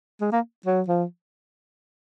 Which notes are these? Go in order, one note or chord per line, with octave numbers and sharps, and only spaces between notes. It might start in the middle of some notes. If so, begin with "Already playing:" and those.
G#3
A#3
F#3
F3